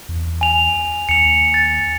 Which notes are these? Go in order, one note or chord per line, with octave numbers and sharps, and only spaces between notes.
E2
G#5 F7
D#2 C#7 F7
A6